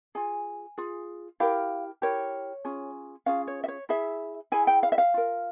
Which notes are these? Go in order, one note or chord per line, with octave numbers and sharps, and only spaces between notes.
F4 G#4 G#5
F4 G#4
E4 G4 A#4 F5
E4 G4 A#4 C#5
C#4 F4 G#4
C#4 F4 G#4 F5
C#5
E5
C#5
E4 G#4 E5
E4 G#4 G#5
G5
F5
E5
F5
F4 A#4